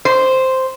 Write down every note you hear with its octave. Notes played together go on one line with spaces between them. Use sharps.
C5